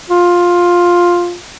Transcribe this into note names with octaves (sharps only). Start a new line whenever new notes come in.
F4